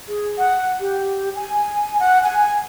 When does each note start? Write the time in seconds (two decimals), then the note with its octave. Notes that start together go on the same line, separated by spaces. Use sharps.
0.08 G#4
0.38 F#5
0.80 G4
1.35 G#5
1.99 F#5
2.24 G#5